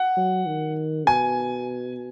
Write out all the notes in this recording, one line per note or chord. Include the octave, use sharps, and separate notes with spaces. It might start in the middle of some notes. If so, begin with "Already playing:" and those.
Already playing: F#5
F#3
D#3
B2 G#5